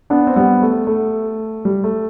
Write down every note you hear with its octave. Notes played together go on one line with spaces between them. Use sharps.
B3 D4
C4
G3 B3
A3
A3
G3
A3